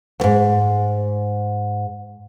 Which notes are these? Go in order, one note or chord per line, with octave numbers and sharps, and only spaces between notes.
D2 G#2